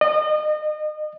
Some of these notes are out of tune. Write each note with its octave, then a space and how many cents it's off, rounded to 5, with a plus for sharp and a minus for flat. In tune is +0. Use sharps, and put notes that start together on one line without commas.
D#5 -35